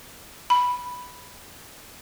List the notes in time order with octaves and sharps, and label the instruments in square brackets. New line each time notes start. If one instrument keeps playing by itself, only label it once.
[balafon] B5